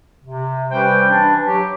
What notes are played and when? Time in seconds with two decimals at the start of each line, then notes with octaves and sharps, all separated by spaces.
0.24 C3
0.71 G3 C#4 G4 B4 C5 G5
1.07 E3 D4
1.45 F#3 G4